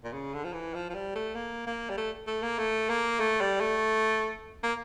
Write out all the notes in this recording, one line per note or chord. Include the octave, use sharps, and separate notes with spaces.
A#2
C#3
D3
F3
E3
F3
F3
G3
A3
A#3
A#3
G3
A3
A3
A#3
A3
A#3
A3
G3
A3
A#3